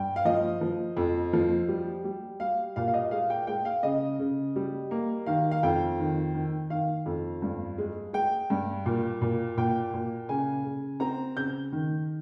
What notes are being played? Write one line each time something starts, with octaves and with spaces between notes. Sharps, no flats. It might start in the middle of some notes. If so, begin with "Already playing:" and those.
Already playing: G2 G5
F5
F3 D#5
F3
F2
F3
G3
G3
G3 F5
A#2 F5
F5
D#5
G#3 F5
G5
G#3 G5
F5
C#3 D#5
C#3
G3
A#3
D#3 F5
F5
F2 G5
D#3
D#3
D#3 F5
F2
G2
G#3
G#3 G5
G2
A#2
A#2
A#2 G5
A#2
C#3 G#5
C#3
C4 A#5
C#3 G6
D#3